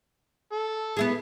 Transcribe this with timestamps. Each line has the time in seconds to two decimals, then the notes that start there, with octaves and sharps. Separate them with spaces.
0.52 A4
0.97 B3 E4 G#4